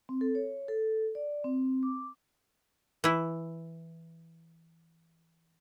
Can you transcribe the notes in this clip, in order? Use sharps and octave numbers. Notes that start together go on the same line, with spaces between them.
C4
A4
C#5
A4
D5
C4
D6
E3 E4